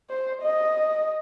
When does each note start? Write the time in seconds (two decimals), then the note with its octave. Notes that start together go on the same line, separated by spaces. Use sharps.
0.10 C5
0.42 D#5